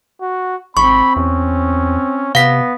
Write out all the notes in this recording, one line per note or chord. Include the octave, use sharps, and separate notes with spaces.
F#4
G#1 C4 B5 C#6
E2 C#4
C3 B3 F5 B6